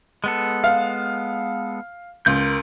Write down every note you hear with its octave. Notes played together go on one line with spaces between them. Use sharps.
G#3 B3 A4
F5
C#2 A#4 C6 G6